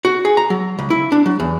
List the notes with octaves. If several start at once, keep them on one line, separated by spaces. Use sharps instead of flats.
F#4
G#4
A#5
F#3
C#2
E4
D4
F#3
E2